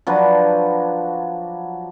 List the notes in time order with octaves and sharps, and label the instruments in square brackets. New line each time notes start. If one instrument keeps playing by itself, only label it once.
[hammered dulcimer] F3 F#3 D4 B4